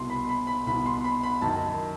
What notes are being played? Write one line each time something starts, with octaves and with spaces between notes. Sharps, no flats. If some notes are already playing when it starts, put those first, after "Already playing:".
Already playing: C2 B2 C6
B5
B5
B5
C2 B2 B5
C6
B5
B5
F#2 D#3 A5